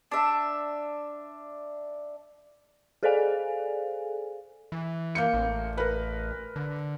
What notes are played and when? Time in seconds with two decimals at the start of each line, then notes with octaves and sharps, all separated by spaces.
0.11 D4 E5
3.03 G#4 A4 C5 D5 F5 G#5
4.72 E3
5.15 A#3 G6 C#7
5.34 A1
5.78 A#4 B4
6.56 D3